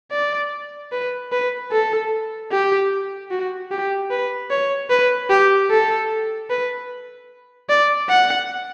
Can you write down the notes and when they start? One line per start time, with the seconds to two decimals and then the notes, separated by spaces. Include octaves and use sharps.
0.12 D5
0.92 B4
1.32 B4
1.72 A4
2.51 G4
3.31 F#4
3.71 G4
4.11 B4
4.51 C#5
4.90 B4
5.30 G4
5.70 A4
6.50 B4
7.69 D5
8.09 F#5